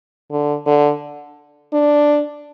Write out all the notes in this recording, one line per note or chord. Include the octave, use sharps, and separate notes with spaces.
D3
D3
D4